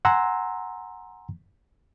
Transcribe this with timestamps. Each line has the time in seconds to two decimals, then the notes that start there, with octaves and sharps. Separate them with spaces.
0.05 F#5 G#5 A#5 C6 E6